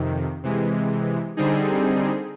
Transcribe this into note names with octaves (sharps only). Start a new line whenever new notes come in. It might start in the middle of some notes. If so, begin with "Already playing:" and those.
Already playing: F2 C3 D#3
C3 E3 G#3
D3 G3 C4 D#4 G#4